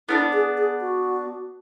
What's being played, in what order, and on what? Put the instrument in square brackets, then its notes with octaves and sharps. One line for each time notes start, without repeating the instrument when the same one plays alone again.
[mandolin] B3 D4 A4 D5 [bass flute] E4
[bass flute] G#4
G#4
F#4